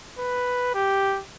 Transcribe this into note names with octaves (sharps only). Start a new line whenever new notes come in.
B4
G4